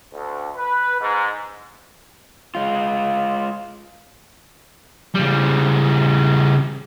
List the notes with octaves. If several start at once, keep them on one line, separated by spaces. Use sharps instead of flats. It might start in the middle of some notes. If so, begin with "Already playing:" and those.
D2
B4
G#2
G#3 F4
C#3 G3